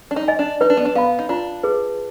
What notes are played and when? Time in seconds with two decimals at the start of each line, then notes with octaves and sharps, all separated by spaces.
0.11 D4
0.16 D#4
0.28 D#5 G#5
0.39 D4
0.61 D#4 B4
0.70 D4
0.77 B3
0.85 D4
0.95 B3 F5 B5
1.19 D#4
1.29 D4 F4
1.63 G#4 B4